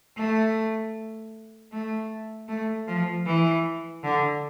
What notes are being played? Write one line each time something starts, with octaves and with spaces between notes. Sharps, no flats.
A3
A3
A3
F3
E3
D3